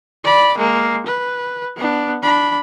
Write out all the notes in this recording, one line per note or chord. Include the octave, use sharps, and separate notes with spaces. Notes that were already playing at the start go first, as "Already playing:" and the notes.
D5 B5
G#3 A#3
B4
B3 D4
D4 B5